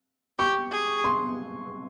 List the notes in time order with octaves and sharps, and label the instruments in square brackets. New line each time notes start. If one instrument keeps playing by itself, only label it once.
[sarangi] G4 [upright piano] C#6
[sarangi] G#4
[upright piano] C6